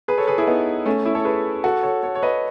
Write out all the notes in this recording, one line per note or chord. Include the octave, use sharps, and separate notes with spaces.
G#4 B4
A4 C#5
G#4 B4
E4 G#4
B3 D#4
A3 C#4
C#4 E4
A4 C#5
G#4 B4
F#4 A4
A4 C#5
A4 C#5
C#5
B4 D#5